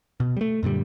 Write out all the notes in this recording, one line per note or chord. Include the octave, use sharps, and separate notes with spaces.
B2
G3 A3
F#2 A#2 D3 G3